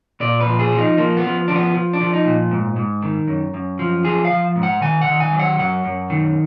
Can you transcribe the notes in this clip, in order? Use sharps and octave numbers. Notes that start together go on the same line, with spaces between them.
A#2 D5
B4
F3
G#4
F3
D#4
F3 A#3
B3
F3
F3 D4
B3
F3
D4
F3
D#4
A#2
G#2
G#2
D#3
F#2
F#2
F3
F3 G#4
F5
F3
G#2
F#5
D#3 G#5
F#5
D#3
G#5
F#3
F#5
F#2 F#5
F#2
D#3